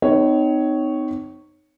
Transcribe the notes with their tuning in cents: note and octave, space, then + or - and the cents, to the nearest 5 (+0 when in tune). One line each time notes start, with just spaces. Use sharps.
C4 -40 D#4 -15 C#5 +0